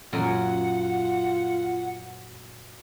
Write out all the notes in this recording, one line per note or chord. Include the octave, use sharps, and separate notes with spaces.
F#2 A#2 F4 A#4 F#5 G#5